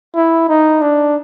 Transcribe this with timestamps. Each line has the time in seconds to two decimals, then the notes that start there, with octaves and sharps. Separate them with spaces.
0.16 E4
0.49 D#4
0.81 D4